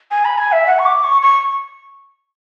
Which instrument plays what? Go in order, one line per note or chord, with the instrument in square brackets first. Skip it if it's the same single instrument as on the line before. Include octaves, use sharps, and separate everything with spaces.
[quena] G#5
B5
G#5
E5
F#5
C#6
D6
C#6
C#6